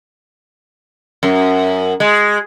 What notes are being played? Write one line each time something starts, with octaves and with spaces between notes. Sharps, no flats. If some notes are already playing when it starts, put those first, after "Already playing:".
F#2
G#3